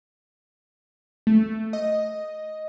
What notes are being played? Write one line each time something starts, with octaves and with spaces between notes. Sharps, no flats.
A3
D#5